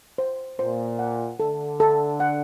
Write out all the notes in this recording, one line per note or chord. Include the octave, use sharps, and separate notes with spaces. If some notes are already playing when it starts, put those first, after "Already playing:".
C5
A#2 C5
F#5
D3 A4
A4
F#5